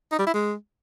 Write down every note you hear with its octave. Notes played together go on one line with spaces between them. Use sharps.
D#4
G3
E4
G#3